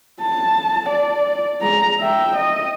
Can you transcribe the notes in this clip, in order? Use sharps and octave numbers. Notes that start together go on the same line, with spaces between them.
A5
D5
G#3 A#5
E5 G5
D#5